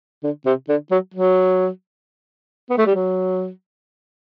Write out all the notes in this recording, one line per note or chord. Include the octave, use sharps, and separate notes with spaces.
D3
C3
D3
F#3
F#3
B3
A3
G3
F#3